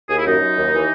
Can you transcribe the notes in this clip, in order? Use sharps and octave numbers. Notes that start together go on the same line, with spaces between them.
D#2 G#4
E4
F#2 D#4
F#2
D#2
E3